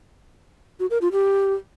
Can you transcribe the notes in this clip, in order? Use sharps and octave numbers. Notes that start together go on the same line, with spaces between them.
F#4
A#4
F4
G4